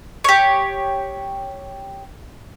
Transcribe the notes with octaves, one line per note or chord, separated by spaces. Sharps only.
G4 C#5